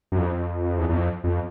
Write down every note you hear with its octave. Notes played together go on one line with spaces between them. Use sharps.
F#2
F2
E2
E2
F2
F2